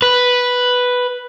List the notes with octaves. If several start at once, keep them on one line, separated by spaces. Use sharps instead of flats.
B4